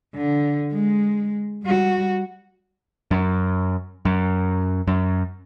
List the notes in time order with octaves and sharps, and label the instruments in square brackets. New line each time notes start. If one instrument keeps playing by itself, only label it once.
[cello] D3
G#3
G3 F#4
[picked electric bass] F#2
F#2
F#2